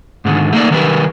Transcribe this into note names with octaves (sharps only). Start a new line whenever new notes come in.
G#2 D3 D#3
A3 A#3 D#4 D5
D#3 G3 A#4 B4